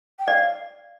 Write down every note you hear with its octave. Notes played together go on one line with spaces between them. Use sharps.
G5
D5 F5